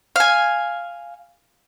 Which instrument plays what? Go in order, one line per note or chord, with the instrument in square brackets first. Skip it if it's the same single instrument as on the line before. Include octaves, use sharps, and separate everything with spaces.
[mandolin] F5 G#5